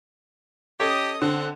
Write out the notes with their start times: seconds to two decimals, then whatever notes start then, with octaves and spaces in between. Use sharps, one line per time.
0.80 C#4 G4 A4 C#5 D#5 D#6
1.22 D3 C4 F#5